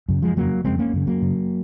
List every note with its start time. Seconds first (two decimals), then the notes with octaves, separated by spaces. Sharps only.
0.09 F#2 C#3
0.22 F3 G#3
0.36 F2 C#3 F#3 A#3
0.64 F2 C#3 G#3 C4
0.79 A#3 C#4
0.93 F#2 C#3
1.07 F#3 A#3
1.22 F#2 C#3